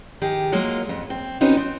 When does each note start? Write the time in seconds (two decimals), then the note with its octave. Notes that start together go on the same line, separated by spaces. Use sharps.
0.22 D#3 G4 G#4
0.52 F#3 G#3 A#3 F4
0.89 F2
1.10 C4
1.41 C4 C#4 D#4 F4 F#4 B4
1.57 C4